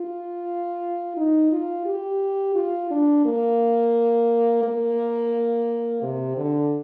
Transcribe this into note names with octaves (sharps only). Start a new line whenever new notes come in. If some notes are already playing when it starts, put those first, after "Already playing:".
Already playing: F4
D#4
F4
G4
F4
D4
A#3
A#3
C3
D3